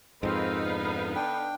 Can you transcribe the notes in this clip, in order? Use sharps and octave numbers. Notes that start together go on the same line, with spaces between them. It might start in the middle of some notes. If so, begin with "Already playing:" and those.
F2 G#2 D#3 F3 C4 D#4 B4 F5
D3 B3
D4 G5